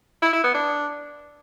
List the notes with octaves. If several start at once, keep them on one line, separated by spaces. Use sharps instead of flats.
E4
E4
B3
D4